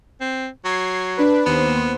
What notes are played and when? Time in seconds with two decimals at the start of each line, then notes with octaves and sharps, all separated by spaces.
0.21 C4
0.65 F#3 G#6 C7
1.17 D4 B4
1.46 D#2 B3 C5 E7